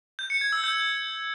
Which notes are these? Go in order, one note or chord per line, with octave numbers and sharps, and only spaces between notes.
G6
C#7
G#6
E6
G6